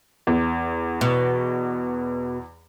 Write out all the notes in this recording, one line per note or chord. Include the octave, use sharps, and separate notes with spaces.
E2
B2